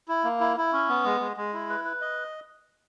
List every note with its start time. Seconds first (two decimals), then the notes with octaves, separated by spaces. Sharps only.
0.08 E4
0.24 A#3
0.40 E4
0.57 E4
0.73 C#4
0.89 B3
1.04 G#3
1.21 G#3
1.37 G#3
1.53 E4
1.70 B4
1.85 B4
2.01 D#5